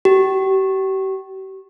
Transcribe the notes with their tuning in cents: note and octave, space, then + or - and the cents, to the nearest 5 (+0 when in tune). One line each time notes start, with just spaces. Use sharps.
G4 -40